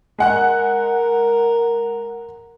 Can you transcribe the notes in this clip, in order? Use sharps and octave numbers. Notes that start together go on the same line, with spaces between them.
G#3 A#4 F#5 F#6